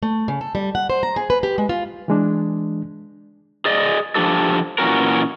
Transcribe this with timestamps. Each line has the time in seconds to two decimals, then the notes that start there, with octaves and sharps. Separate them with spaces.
0.03 A3
0.28 C#3
0.41 A4
0.55 G3
0.75 F#5
0.90 C5
1.03 A#5
1.16 G#4
1.30 B4
1.43 G4
1.58 G#3
1.69 F4
2.08 E3 G#3 D4
3.65 G#4 D5 D#5
4.15 F3 D4 G4 A4
4.78 A#2 E3 F3 C#4 F#4 A#4